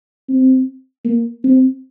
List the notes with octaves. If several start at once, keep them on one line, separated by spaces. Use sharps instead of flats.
C4
A#3
C4